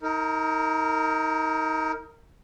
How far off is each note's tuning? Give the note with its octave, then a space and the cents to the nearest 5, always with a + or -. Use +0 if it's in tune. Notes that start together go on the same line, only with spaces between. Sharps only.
D#4 +30 A#4 -15